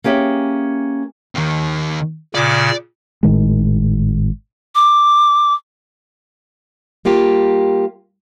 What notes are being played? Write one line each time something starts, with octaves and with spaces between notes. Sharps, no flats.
A#3 C#4 G4 G#4 E5
D#2 D#3
A#2 C#3 D5
G#1 A2 D#3 G#3
D6
G3 A#3 F4 G4